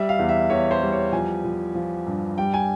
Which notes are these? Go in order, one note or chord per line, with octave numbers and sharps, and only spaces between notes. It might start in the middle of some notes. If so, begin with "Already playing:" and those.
Already playing: G3 E5
F5
E2
E5
E2 C#5
C5
G3
C#5
F3 G#5
F3
F3
G2
G3 G5
G#5